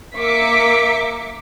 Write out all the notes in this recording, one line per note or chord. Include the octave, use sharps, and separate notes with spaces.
A#3 A#4 E5 D6 B6 C#7